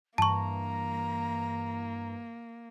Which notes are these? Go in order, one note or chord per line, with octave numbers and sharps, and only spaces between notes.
G2 E3 A#3 A5 A#5 C#6